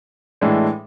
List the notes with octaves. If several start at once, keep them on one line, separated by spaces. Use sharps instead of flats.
A2 E3 G#3 D4